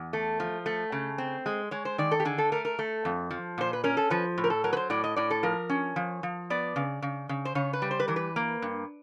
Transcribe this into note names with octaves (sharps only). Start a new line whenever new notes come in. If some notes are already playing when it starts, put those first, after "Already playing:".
Already playing: E2
A3
F3
A3
C#3
C4
G#3
G#3 C#5
C5
D#3 D5
A4
G4
D3 G#4
A4
A3 A#4
A#4
A3
F2
F3
A#2 C5
B4
C#4 A#4
A4
F3 B4
A2
A#4
A4
F#3 A#4
B4
C5
A2 D5
D#5
A2 D5
A4
F3 A#4
C#4
F3
F3
B3 D5
C#3
C#3
C#3
C5
C#3 C#5
B4
G3
C5
B4
E3 A#4
B4
A#3
G2